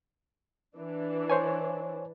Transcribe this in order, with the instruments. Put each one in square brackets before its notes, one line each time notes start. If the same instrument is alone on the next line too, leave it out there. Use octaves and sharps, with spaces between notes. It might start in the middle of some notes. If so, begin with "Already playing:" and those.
[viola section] E3 D4
[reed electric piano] C5 C#5 G#5